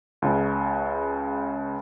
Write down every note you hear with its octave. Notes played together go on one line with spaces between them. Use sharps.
C#2 C#3